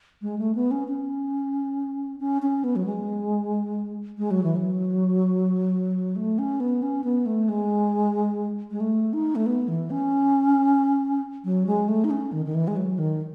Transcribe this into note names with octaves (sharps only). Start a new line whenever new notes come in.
G#3
A3
B3
C#4
C#4
C#4
C#4
B3
F#3
G#3
G#3
F#3
E3
F#3
A3
C#4
B3
C#4
B3
A3
G#3
G#3
A3
D#4
A3
B3
E3
C#4
F#3
G#3
A3
D#4
C#4
D#3
D#3
E3
G#3
F#3
D#3